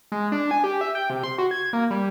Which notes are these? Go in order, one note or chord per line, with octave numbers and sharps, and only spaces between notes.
G#3
D4
G#5
G4
E5
G5
C3
C6
F#4
G#6
A#3
G3